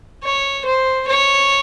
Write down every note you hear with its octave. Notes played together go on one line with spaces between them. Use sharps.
C#5
C5
C#5